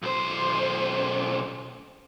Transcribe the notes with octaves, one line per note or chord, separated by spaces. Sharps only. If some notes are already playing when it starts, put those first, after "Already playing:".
B1 C5